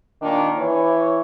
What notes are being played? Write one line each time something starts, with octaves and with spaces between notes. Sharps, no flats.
A#2 D#3 D4
E3 C#5